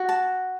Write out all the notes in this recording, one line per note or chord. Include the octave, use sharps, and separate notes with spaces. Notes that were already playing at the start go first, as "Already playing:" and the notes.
Already playing: F#4
A5